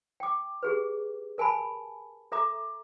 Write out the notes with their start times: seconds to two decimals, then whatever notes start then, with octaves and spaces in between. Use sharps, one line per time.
0.20 G5 D6
0.63 G4 G#4 B4
1.38 A#4 G#5 A5 B5
2.32 A4 E5 A#5 D6